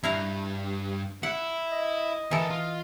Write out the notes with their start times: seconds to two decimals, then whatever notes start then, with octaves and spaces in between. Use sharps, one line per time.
0.04 G2 E4 F5 A#5
1.23 E4 F#5
1.72 D#5
2.31 E3 A4 A#4 A5
2.50 F4